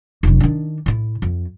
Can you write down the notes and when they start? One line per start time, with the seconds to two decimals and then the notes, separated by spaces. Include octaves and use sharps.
0.23 F1 F#2
0.40 D#3 D4
0.86 A2 E4
1.22 F2